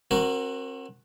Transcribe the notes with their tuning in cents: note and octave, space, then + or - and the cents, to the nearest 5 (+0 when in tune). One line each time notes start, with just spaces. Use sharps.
C4 +40 F#4 +0 A#4 +0